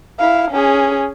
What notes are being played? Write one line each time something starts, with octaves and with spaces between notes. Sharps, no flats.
E4 F5
C#4 G#4